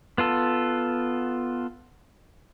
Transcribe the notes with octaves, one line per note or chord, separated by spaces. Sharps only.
B3 F4 A4